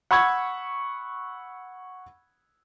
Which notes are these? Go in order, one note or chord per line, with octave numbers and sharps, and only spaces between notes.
F#5 B5 C#6 E6 G#6